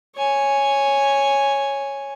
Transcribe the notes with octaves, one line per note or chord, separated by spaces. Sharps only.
C#5 G#5